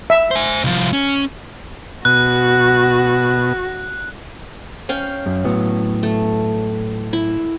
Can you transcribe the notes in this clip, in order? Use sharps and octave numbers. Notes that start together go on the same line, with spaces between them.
E5
C5 G#5
C2 F3
C#4
B2 F#4 F#6
C#4 F5 G5
F#2
A2 F#3 B3
A3
E4